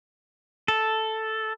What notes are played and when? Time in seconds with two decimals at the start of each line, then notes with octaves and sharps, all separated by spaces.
0.68 A4